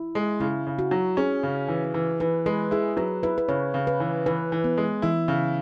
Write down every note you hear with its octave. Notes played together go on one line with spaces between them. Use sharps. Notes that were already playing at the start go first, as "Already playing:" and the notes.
Already playing: E4
G#3
C#3 E4
C#3
F#4
F#3
C#4 G#4
C#3
E3
E3
E3 B4
G#3 B4
E4 G#4
F#3 B4
E4 B4
B4
C#3 C#5
C#3
B4
E3
E3 B4
E3
B3
G#3
E3 E4
C#3